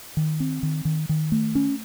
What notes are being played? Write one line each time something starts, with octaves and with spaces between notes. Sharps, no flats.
D#3
C4
D#3
D#3
D#3
A3
C#4